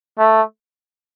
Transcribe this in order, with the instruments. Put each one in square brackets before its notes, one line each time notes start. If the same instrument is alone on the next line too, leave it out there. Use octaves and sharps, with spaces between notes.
[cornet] A3